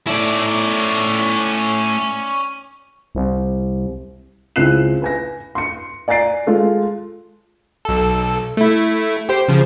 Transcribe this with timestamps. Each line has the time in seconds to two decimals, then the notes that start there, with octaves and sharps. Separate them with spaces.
0.07 A3 C#4 E4 D5
3.15 C2
4.56 C#2 C4 E4 F#6 C7 E7
5.02 B4 G#5 A#6
5.55 C6 C#7
6.08 D5 G#5 A#5 A6 C7 D7
6.47 G#3 F4 A4
7.85 B1 A4
8.57 A3 E4
9.29 G4 C5 C6
9.48 C#3 F3